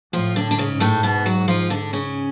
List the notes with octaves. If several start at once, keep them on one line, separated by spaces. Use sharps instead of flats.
A2 F3 F4
D3 D4
D4
G#2 C#3 C#4
A2 A3
B2 B3
F#3 F#4
F3 F4
D3 D4
C#3 C#4